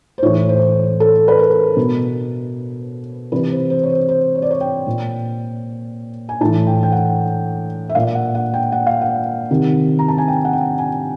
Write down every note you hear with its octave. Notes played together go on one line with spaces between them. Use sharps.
C5
A2 E3 C#5
C5
A4
B4
A#4
B2
C3 E3 B4
C5
C5
C#5
C5
C5
C#5
D5
C#5
G5
A#2
G#5
A2 E3 A5
G5
G5
F#5
E5
A#2 F5
F#5
F#5
G5
F#5
F5
F#5
C3 D#3
A#5
A5
G#5
G5
F#5
G5
G#5